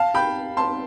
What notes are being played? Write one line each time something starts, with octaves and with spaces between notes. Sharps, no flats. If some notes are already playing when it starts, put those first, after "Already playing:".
Already playing: F5 A5
G5 B5
A5 C6